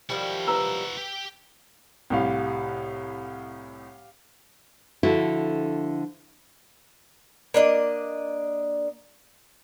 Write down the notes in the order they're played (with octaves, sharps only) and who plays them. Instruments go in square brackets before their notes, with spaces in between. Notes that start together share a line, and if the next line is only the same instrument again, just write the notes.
[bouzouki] D#3 F3 G3 [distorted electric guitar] E4 F#4
[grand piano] B4 A#5 E6
[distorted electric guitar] G4 G5
[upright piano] C2 A2 [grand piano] G4 F5
[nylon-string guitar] D3 F3 E4 F#4 A4
[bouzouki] A#3 D4 D#5